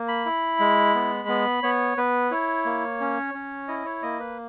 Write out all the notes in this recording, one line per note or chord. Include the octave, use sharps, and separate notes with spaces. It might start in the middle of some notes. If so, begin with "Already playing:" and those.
Already playing: A#3
B5
E4
G#3
B3
B3
B3 C#5
B3 B4
E4 C#5
A#3
C#4
C#4
E4 D#5
C#5
A#3 D#5
B4